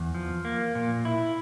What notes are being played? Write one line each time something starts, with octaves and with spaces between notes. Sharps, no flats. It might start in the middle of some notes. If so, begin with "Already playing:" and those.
Already playing: E2
F3
A#3
A#2
E4